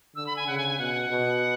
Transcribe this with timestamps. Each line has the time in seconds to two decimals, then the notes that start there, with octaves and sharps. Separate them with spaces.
0.16 D3 E6
0.27 B5
0.36 G#5
0.47 C#3 F#5
0.58 G#5
0.68 G#5
0.78 B2 F#5
1.09 B2